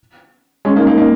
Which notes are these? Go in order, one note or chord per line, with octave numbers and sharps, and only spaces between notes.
G#3 C#4
A#3 D#4
A#3 D#4
A#3 D#4